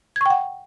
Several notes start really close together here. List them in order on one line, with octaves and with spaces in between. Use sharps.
G#6 C#6 G5 F#5